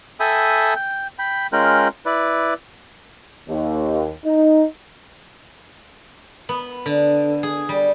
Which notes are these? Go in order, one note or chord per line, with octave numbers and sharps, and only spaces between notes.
A4 E5 G5 G#5 B5 D#6
G5
G5 B5
G#3 C#4 F4 A#4 G5 F#6
E4 B4 D5
D#2
D#4
B3
D3
G#4
G3